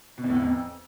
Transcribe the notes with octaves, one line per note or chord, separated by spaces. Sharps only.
B2
E2
A2
E2
F2